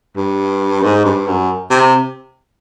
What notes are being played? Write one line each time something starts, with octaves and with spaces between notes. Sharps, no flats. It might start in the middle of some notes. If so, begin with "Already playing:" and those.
G2
G#2
G2
F#2
C3